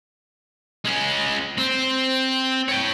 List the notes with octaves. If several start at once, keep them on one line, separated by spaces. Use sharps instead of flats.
G#3 C#4
C4
C#5 G5